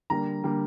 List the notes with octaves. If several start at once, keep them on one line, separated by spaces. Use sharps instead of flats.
D3 G3 A#3 A#5
D3 G3 A#3